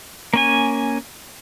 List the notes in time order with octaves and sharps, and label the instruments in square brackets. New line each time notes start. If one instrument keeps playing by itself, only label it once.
[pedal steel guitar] A#3 C#4 G#5